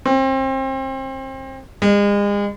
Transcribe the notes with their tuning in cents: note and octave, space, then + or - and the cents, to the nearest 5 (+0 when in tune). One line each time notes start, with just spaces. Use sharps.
C4 +30
G#3 -35